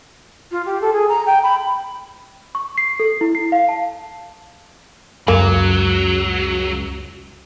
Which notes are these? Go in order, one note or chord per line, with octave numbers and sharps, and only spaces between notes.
F4
G4
A4
G#4
A#5
G5
B5
C#6
C7
A4
E4
C7
F5
A5
C#2 F#2 F#3 A#3